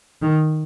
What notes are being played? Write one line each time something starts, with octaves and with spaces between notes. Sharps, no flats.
D#3